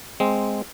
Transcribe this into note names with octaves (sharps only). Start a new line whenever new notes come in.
G#3 C4